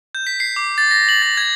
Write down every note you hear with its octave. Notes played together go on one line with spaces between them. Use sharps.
G6
B6
C7
D6
A6
A#6
F#7
A6
G#6